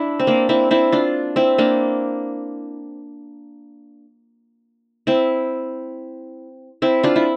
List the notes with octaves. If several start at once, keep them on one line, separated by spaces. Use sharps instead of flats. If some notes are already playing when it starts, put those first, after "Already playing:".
Already playing: D4 E4
C4
A#3 D4
C4 E4
C4 E4
D4 F4
C4 E4
A#3 D4
C4 E4
C4 E4
D4 F4
E4